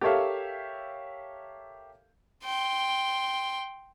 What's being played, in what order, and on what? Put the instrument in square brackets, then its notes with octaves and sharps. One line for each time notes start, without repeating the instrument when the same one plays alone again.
[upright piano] G4 A4 A#4 C#5 E5 F5
[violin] G5 C6